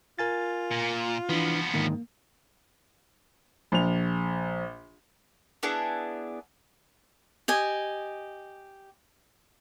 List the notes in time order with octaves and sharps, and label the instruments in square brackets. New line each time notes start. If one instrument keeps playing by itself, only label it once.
[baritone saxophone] F4 [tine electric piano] A#4 G#5 A6
[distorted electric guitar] A#2
[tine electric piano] E3 D4 [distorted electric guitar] F3 B3
[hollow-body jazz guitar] D2 G#2 D#3 [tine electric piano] A#3
[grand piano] A#1 F7
[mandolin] B3 D4 E4 G#4
[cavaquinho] G4 D#5 G#5